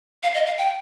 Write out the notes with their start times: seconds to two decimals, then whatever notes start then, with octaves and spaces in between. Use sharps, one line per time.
0.23 F5
0.34 D#5
0.46 F5
0.58 G5